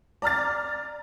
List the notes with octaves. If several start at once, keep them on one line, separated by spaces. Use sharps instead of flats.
D5 A#5 F6 A6